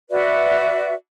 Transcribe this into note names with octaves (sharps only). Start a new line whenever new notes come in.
F#4 B4 D5 E5